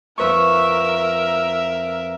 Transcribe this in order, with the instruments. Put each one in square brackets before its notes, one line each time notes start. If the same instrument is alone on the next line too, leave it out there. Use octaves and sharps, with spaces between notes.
[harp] F2 B4 C#6 [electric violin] A#4 E5